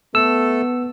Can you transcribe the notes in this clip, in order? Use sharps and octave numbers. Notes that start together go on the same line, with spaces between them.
A3 B3 A4 E6